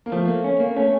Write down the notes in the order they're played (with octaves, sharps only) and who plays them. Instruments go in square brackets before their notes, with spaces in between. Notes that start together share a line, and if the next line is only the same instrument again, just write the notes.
[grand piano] A#3
[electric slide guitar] F3 [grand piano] A3
[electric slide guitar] A#3
C#4
A#3
[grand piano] A3 [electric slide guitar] C#4